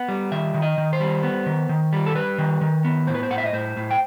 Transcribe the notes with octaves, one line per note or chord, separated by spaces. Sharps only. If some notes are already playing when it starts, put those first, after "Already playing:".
Already playing: B3 F#5
G3
D#3 E5
D#3
D#5
D#3
C5
G3
B3
D#3
D#3
G3
A4
G3 B4
D#3
D#3
B3
A2 C5
B4
C5
A2 F#5
E5
D#5
A2 C5
A2
G5